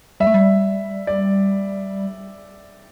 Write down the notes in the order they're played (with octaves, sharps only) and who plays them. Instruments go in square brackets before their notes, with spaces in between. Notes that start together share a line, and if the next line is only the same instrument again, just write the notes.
[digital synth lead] G3 [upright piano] E5
[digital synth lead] A3
G3
[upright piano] D5